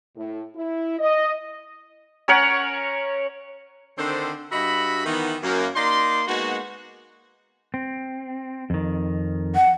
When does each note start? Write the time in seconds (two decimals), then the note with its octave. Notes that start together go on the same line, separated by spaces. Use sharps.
0.16 A2
0.55 E4
0.99 D#5
2.28 C#4 A#4 C#5 F#5
3.98 D3 D#3 C4 D4 A4 C5
4.51 G2 F#4 D#5 E5 B5
5.05 D#3 E3 B3
5.43 F#2 A#3
5.75 A#3 D#4 D5 C6
6.28 G#3 A#3 B3 D#4 F#4
7.74 C4
8.70 F2 D#3
9.55 F#5